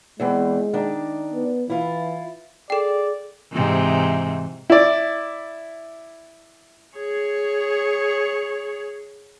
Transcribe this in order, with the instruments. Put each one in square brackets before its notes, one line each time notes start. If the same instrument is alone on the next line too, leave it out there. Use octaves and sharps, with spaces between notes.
[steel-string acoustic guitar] E2 E3 C4 [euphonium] G#3
[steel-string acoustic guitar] D#3 D4
[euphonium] B3
[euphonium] E3 [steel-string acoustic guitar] E4 F4
[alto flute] G#4 [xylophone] A4 G5 [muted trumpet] D5
[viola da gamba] G#2 C3 E3
[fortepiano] E4 D5
[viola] G#4 C#5